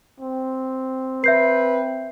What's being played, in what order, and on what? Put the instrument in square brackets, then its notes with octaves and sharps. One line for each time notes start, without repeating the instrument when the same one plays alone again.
[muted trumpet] C4
[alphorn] B4 [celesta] E5 G6 C7